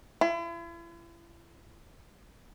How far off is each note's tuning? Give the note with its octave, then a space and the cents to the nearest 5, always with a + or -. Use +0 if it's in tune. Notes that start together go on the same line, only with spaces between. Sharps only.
E4 +40